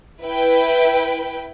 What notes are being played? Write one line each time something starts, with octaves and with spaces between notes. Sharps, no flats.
E4 B4 G5